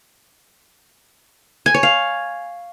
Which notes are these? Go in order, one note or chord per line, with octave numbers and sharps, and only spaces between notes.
G#5
C#5
F5